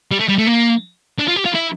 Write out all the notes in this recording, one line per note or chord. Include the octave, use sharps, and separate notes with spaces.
G3
A3
G3
A3
A#3
D4
F4
G4
F4
E4